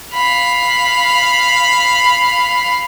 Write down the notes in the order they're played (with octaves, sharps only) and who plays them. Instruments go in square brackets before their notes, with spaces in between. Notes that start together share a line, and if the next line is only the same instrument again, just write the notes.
[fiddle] F5 B5